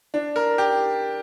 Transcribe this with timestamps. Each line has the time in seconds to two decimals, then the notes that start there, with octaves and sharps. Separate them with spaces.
0.14 D4
0.36 A#4
0.58 G4